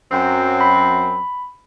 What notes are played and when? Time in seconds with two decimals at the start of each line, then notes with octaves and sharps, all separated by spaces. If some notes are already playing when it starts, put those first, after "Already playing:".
0.12 F#2 F#3 C4
0.61 B5